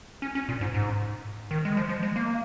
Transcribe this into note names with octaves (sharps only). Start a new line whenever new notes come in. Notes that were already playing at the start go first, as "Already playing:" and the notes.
C#4
C#4
A#2
G#2
G#2
D#3
G#3
F3
F3
G#3
A#3